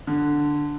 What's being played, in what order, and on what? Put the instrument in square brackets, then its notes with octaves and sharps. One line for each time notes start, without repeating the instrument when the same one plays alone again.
[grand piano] D3